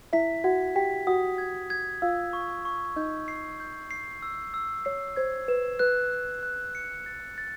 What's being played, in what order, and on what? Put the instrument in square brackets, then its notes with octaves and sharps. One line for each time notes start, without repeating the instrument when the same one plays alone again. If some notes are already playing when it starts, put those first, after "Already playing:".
[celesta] E4 E5 [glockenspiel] B6
[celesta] F#4 F#5 [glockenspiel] G#6
[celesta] G4 G5 [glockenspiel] B6
[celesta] F#4 F#5 [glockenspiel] D#6
[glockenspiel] G#6
G#6
[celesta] F4 F5 [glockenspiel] E6
[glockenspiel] C#6
C#6
[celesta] D#4 D#5 [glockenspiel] G6
[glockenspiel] C7
G6
C7
E6
E6
[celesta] C#5 [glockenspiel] C7
[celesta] C5 [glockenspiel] G#6
[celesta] B4 [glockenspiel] E7
[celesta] B4 [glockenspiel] F#6
[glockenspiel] F#6
F#6
C#7
A6
A6